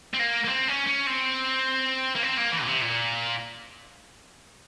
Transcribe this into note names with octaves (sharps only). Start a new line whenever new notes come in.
C4
A#3
A#3
C4
C#4
C#4
C4
A#3
C4
A#3
E3
A#2
C3
A#2